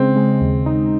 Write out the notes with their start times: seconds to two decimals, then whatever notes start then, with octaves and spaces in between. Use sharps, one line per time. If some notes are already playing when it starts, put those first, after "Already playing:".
Already playing: C#3 G#3 C4
0.16 G#3
0.41 D#2
0.66 D#4